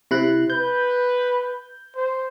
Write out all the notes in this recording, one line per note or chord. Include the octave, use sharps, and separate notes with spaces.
C3 E4 F#6
B4 G6
C5